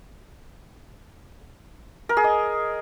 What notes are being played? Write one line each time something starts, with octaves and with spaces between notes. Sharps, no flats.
A#4
G#4
D#5